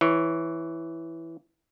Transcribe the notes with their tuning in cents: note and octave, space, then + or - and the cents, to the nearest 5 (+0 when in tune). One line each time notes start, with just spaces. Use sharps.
E3 +0 C#5 +0